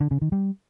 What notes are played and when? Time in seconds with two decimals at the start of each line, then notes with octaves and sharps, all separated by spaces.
0.01 D3
0.11 C#3
0.22 D#3
0.32 G3